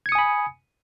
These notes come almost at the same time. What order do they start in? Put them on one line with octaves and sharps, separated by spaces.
G#6 C#7 D#6 G#5 B5